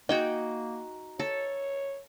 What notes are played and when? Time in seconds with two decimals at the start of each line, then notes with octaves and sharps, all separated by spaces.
0.09 A#3 D#4 F#4 G#4 G5
1.20 A4 C#5